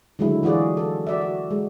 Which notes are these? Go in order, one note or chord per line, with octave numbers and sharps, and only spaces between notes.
D3 D#3 F#3 G#3 A3 E4
E3 F4 F#4 G#4 D5
A4
F#4 D5 E5
F#4
G#3